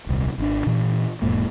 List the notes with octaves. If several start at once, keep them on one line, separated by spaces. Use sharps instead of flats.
D#1 C2
G#1 D3 D4
A#2 E3
E1 E2 G#2 A#3